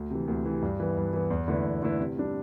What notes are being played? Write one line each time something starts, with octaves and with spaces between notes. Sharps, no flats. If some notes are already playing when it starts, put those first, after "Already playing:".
Already playing: D2
C3 E3
D2
C3 E3
G2
E3 B3
G2
E3 B3
E2
D3 A3 E4 B4
E2
D3 A3 E4 B4
C3
G3 D4